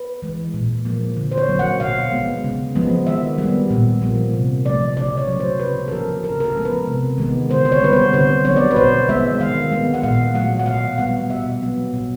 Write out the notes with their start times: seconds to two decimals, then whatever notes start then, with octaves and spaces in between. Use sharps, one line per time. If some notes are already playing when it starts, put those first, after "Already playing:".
Already playing: B4
0.22 E3 G#3
0.54 A#2
0.85 F3 A#3
1.17 D3
1.31 C5
1.38 C#5
1.49 F#3 A#3
1.59 F#5
1.80 B2 F5
2.12 G#3 B3
2.44 C#3
2.75 F3 G#3 B3
3.07 D#3 E5
3.38 G3 B3
3.70 A#2
4.02 F3 A#3
4.34 C3
4.65 F3 A3 D5
4.97 C#3 D5
5.17 C#5
5.28 F#3 A3
5.40 C5
5.60 C#3 B4
5.88 A4
5.91 F3 A#3 A#4
6.23 C#3 A#4
6.40 A#4
6.44 A4
6.55 F3 G#3 B3
6.65 B4
6.87 C3
7.18 D#3 G#3 B3
7.50 D3 C5
7.65 C5
7.72 C#5
7.82 G3 B3 B4
7.93 C5
8.13 D3 C5
8.45 F#3 B3 C#5
8.56 D5
8.71 B4
8.76 B2 C5
9.09 G#3 B3 E5
9.40 D#3 F5
9.72 G#3 B3
9.94 F#5
10.03 A#2 F5
10.34 F#3 A3 F#5
10.59 F#5
10.66 B2 F5
10.98 G3 B3 F#5
11.30 B2 E5
11.62 F#3 B3
11.93 B2